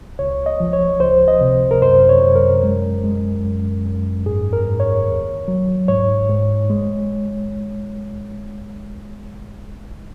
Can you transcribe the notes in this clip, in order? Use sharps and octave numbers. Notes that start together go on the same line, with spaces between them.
C#2 C#5
D#5
F3
C#5
C#2 C5
D#5
C3
A#4
F#2 C5
C#5
F#2
A#4
G#3
G#3
F#2
F#2
G#2 G#4
A#4
G#2
C#5
D#2
F#3
G#2 C#5
G#2
G#3